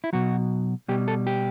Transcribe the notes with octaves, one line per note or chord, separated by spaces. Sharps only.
E4
B2 F#3 F#4
B2 G3 G4
A4
G4